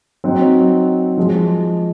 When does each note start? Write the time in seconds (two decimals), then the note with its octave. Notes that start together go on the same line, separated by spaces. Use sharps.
0.24 F#3 C4 D#4
1.17 F3 G#3